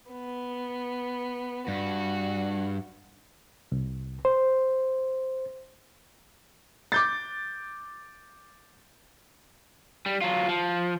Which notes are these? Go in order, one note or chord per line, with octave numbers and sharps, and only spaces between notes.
B3
G2 F#4
C2
C5
D6 G6 A6
G3
F#3 F4
F3